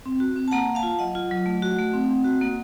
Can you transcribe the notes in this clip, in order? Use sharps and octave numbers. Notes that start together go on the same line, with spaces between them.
C4
F#4
C4
A5
A#3 F#5 A#5
A#3
F5 A5
F4
F#3 D#5 F#5
F4
F#3
A3
F#4
A3
C4
C4
F#4
A#3